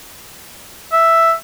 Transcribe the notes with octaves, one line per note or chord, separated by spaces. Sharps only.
E5